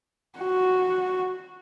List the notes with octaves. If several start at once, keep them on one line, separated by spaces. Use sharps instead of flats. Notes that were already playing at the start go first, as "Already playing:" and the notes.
F#4